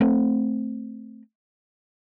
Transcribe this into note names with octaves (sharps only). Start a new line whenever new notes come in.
A3 C4